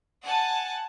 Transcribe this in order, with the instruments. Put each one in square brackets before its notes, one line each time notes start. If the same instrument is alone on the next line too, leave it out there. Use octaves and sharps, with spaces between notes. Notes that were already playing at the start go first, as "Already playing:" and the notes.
[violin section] F#5 G#5 A5